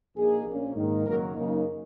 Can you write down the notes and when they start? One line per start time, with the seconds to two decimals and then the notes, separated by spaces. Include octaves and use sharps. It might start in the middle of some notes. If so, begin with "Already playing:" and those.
0.16 A#1 A#2 A#3 D#4 G#4
0.46 A#1 A#2 A#3 C#4
0.75 G#2 D#3 A#3 D#4
1.06 F#1 F#2 D#3 F#3 A#3 A#4
1.35 F#2 C#3 A#3 D#4